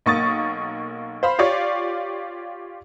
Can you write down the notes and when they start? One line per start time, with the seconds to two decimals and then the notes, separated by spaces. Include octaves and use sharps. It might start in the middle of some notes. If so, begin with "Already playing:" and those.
0.06 B1 A#3 C#6 D#6 A6
1.23 C5 F5 B5
1.39 F4 G4 C#5 D5 F5